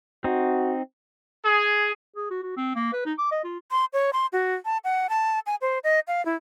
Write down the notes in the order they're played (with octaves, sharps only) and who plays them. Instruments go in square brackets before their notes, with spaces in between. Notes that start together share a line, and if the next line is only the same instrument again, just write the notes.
[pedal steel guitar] C4 D#4 [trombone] F#4
[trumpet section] G#4
[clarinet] G#4
F#4
F#4
C4
A#3
B4
D#4
D6
D#5
F4
[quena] C6
C#5
C6
F#4
A5
F#5
A5
G#5
C5
D#5
F5
E4